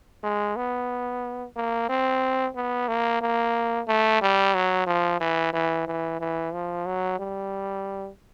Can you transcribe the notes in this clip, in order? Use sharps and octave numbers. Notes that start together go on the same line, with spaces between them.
G#3
B3
A#3
C4
B3
A#3
A#3
A3
G3
F#3
F3
E3
E3
E3
E3
F3
F#3
G3